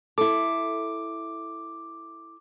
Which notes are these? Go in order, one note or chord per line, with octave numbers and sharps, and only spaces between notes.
E4 A4 D6